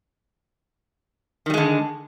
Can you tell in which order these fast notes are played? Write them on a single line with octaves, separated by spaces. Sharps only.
D#3 G3 G#3 D3